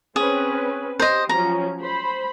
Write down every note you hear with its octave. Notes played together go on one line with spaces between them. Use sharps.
C4 C#4 G#4 B4
G4 C5 D#5
F3 F#3 C#4 A#5
C5 B5